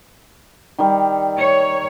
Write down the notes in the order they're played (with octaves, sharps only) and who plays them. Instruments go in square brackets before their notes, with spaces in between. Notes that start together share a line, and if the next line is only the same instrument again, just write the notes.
[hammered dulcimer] D#3 G3
[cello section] C#5